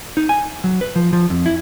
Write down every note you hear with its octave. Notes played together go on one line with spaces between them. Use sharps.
D#4
G#5
F#3
B4
F3
F3
F2
E4